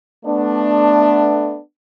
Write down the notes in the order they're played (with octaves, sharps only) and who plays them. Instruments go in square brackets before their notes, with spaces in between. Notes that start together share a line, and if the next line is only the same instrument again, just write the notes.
[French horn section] A3 B3 D4